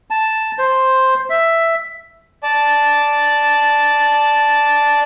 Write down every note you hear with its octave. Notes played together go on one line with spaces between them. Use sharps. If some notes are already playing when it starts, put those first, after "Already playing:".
A5
C5
E5
D5 A5